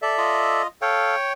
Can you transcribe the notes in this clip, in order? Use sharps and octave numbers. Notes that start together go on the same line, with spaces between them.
A4 D5 E5
F4 D#5
A4 C#5 F5 G5